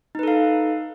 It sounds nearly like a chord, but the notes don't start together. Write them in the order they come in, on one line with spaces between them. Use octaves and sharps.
D#4 B4 A4 F5